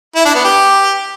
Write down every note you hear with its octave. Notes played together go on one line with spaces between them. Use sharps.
E4
D4
B3
G4